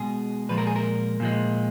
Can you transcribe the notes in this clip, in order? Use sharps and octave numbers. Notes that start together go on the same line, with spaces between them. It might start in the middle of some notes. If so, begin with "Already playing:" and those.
Already playing: B2 G#3 G#4
A#2 F3 G#3 B4
A#4
G#4
A#4
A#2 F3 G#3